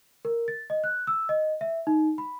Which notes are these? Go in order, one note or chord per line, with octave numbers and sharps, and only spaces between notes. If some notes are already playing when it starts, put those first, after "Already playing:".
A#4
A6
D#5
F#6
E6
D#5
E5
D#4
B5